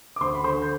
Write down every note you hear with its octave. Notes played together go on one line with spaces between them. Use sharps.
D6
D2 C5 C6
B5
D3 C5 C6
G6